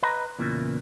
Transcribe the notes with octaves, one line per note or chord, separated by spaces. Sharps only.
B4 D#5 A#5 B5
E2 A#2 C#3 E3